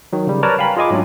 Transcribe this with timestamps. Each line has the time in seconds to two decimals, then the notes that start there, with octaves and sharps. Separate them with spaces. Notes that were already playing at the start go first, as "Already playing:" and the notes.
0.13 D#3 F#3
0.27 C#3 G3
0.43 A#4 B4 C#5 D5 A5 A#5
0.59 F5 G5 G#5 B5
0.77 F4 G#4 D#5 G#5 D6
0.90 G#2 F#3 A3 C#4 D4